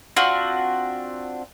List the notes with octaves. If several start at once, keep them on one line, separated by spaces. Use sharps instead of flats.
C4 D4 F4 F#4